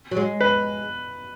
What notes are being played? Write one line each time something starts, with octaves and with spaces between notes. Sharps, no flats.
F#3
G#3
B4